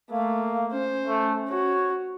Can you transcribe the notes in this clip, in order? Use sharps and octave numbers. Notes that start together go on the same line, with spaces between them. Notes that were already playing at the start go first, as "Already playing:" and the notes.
A3 A#3 F5
C#4 C5
A3
F#4 C#5